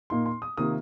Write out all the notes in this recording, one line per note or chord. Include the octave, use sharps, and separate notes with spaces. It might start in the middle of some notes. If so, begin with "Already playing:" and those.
A#2 A#3 D#4 C6
C6
D#6
C3 D#3 A#3 F4 D#6